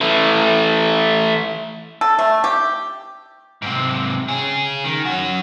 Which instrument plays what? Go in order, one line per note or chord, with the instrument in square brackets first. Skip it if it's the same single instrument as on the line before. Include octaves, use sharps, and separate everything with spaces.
[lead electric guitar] E3 A3
[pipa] A4
A3
G4
[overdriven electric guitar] G#2 C3
C#4 G#4
D#3
C#4 F#4